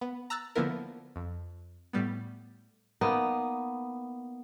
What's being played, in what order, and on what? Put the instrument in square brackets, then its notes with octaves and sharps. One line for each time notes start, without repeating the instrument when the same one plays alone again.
[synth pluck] B3
A#5 E6 F#6 A6
D3 F3 A#3 B3 E4 A#4
F2
A2 G3 B3
[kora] A#3 B3 D#4